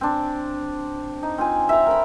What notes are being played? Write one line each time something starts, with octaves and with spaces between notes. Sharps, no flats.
C4 D4
D#4
C4 F4 G#5
E5 A#5
A#4 B5